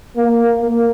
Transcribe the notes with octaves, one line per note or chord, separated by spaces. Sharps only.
A#3
A#3